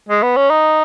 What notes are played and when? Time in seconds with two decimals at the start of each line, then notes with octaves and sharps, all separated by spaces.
0.08 G#3
0.23 B3
0.36 C#4
0.50 D#4